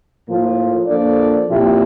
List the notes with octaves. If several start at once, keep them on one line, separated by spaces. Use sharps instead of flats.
A2 F3 A#3 F4
F3 A#3 D4 A4 D5
A#2 F3 C4 E4 G4